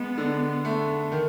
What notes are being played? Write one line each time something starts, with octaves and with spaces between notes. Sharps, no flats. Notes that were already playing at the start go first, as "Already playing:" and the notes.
Already playing: G#3 B3
D3
A3
D#3